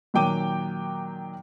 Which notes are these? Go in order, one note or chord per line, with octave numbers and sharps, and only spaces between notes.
A#2 D#3 F#3 G5 D6 D#7